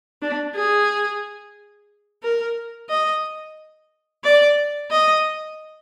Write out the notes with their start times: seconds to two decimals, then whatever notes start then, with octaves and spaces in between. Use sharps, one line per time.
0.22 D4
0.56 G#4
2.23 A#4
2.89 D#5
4.24 D5
4.91 D#5